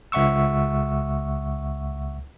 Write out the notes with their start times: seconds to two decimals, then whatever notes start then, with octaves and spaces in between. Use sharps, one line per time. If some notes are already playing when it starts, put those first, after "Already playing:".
0.12 C#2 E5 F#5 C#6 E6